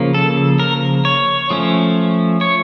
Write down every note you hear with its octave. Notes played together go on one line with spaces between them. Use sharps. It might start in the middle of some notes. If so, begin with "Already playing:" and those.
Already playing: C#3 F3 A#3
A4
A#4
C#5
F3 A3 C#4
C#5